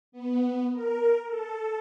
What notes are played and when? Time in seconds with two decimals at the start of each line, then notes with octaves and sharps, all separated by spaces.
0.12 B3
0.73 A#4
1.27 A4